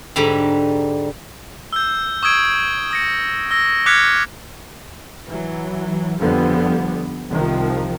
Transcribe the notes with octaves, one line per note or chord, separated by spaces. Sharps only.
G#2 D3 G3 A#5 B5
E6 G6
C#6 D#6 E6 G#6 D7
D#6 A#6 C#7
E6 A#6
D6 F6 F#6 G#6 B6 C#7
E3 F#3
F2 D3 F3 G3 B3
C2 C3 D#3 F3